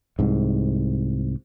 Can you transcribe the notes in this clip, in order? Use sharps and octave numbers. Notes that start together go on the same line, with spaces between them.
C2 G#2